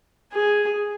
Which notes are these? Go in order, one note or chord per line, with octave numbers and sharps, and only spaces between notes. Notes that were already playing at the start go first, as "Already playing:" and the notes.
G#4